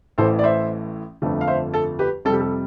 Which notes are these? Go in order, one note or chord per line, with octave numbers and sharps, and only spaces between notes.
A1 A2 E3 A3 A4 C5
D5
C5 E5
G1 F2 D3 F3 A3
F5
C5 E5
A4
G4 B4
F2 C3 G3 A4
G4
A4